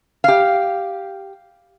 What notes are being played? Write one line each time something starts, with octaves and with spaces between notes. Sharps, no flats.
G4 F5